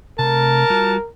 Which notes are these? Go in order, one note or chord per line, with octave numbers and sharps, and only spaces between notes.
C3 A3 A#4 A5
G3 F4 F#4